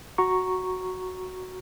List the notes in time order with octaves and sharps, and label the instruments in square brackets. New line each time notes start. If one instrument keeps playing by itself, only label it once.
[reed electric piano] F#4 A#5 C#6